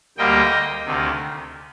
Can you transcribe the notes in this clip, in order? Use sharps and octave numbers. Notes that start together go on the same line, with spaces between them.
D2 D3 G3 A#3 D#5 G5
D2 C3 D#3 A3